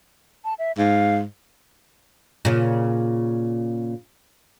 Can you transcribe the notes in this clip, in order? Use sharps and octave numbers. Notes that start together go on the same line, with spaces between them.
A5
E5
G#2 F5
A#2 C#3